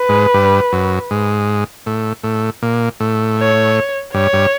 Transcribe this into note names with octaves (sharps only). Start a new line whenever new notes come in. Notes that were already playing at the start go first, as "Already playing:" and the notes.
Already playing: B4
G#2
G2
F#2
G#2
A2
A2
A#2
A2
C#5
G2 C#5
G2